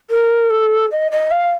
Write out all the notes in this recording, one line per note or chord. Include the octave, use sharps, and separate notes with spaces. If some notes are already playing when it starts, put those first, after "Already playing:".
A#4
A4
D#5
D#5
F5